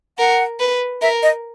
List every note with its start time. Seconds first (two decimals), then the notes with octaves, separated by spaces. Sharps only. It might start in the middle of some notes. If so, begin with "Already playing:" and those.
0.18 A#4 F#5
0.60 B4
1.02 A#4 E5
1.22 D#5